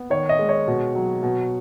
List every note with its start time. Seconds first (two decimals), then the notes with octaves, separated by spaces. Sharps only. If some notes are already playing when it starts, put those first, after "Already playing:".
Already playing: B3
0.10 D#3 C#5
0.29 D#5
0.39 G#3
0.49 C#5
0.67 B2
0.95 F#3
1.23 B2